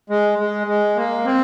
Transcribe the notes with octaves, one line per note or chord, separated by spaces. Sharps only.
G#3
G#3
G#3
A#3
C4